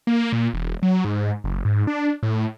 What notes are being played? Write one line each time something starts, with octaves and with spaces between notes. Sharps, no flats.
A#3
A#2
E1
F#3
G#2
F#1
G#2
D4
A2